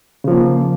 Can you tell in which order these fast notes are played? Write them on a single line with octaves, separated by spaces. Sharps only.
C#3 F3 A#3